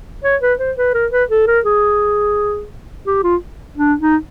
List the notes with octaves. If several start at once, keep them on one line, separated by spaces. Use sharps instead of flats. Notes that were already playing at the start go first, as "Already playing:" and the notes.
C#5
B4
C5
B4
A#4
B4
A4
A#4
G#4
G4
F4
D4
D#4